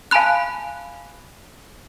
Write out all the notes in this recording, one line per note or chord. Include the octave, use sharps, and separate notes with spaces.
F5 G#5 A5 B5 F#6